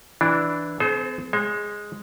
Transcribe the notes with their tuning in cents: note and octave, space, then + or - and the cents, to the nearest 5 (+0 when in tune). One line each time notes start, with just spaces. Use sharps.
E3 +0 D4 +0
C4 -45 G#4 +45 C5 +0
G#3 -5 C5 +40